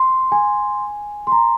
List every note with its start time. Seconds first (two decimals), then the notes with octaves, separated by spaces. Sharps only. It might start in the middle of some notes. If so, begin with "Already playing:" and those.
Already playing: C6
0.32 G#5
1.27 C6
1.32 A#5